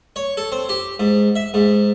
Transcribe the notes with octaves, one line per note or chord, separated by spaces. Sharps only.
C#5
A4
C4
G4
G#2
E5
G#2